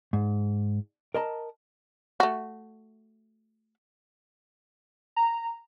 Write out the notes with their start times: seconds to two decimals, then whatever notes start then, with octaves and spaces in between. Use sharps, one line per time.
0.13 G#2
1.14 A#4 D#5 A5 A#5
2.20 A3 F#4
5.16 A#5